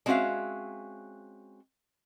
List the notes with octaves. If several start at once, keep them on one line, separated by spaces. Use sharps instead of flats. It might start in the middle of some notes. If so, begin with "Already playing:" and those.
G#3 C4 C#4 F#4 E5 F5